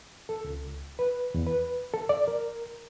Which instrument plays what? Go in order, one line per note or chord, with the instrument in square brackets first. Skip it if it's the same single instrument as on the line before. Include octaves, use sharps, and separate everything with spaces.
[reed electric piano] A4
C#2
B4
E2
B4
A4
D5
A#4